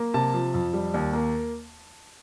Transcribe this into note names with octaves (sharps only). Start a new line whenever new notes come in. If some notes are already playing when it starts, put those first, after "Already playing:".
Already playing: A#3
C3 A5
F3
F2
G3
D#2
A#3